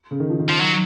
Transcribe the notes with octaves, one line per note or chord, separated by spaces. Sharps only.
C#3
D#3
F3
D#3
F3
F#3